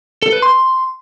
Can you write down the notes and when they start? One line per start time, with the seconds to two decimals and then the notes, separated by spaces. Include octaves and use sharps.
0.23 A4
0.32 B4
0.42 C6